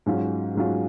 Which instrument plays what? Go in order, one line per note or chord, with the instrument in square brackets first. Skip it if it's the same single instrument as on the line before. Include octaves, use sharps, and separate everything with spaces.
[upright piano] G#2 F#3 C#4 F4
G#2 F#3 C#4 F4